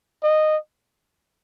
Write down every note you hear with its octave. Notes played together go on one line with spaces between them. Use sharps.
D#5